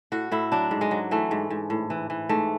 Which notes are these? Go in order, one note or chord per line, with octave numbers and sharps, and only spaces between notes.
A2 F#4
A2 E4
F#3 D4
G#2
G#3
F#3
E3 A3
G#2
G#2
A2
E3
E3
G#2 A3